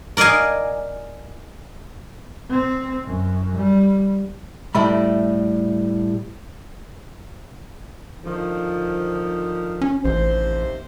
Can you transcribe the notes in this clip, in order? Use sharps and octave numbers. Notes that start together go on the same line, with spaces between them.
A#4 D5 D#5 F5 G#5
C4
F#2
G3
A2 G3 A3 B5
D3 D#3 F3
C#4
A1 D#2 C3 C5